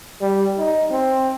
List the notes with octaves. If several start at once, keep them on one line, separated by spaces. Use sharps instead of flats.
G3
D#4
C4